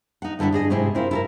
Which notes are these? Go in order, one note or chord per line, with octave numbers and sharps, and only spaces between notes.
D#4 F#5
G2 D3 E4 E5 F#5
D4 G#4 D#5
G#2 C3 E4 G#4
C4 E4 F4 A#4
E4 A4 A#4